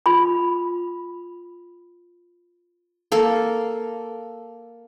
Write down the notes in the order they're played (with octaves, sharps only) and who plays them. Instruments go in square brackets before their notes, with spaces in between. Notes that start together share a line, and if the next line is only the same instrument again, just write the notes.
[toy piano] F4 B5
[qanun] A#3 A4